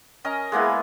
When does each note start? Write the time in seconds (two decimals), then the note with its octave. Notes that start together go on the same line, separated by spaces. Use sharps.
0.25 C#4 A#4 D#5
0.52 G#3 A#3 B3 E4